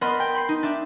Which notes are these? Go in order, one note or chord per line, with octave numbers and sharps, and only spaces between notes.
B3 A#4 D#5 B5 C6 A6
G5
B5 C6 C7
D#4
D4 E5 D6